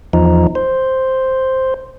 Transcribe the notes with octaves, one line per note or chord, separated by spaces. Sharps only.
E2 F3 D#4
C5